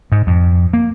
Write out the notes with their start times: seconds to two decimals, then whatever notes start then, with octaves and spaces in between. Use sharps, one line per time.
0.12 G#2
0.27 F2
0.73 A#3